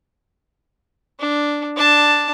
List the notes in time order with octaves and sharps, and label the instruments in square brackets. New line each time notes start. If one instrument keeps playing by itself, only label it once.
[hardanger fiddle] D4
D4 A5